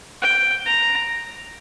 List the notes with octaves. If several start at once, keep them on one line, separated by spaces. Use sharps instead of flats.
G5
A#5